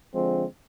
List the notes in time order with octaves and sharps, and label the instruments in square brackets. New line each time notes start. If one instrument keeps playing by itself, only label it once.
[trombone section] D3 F3 G#3 C4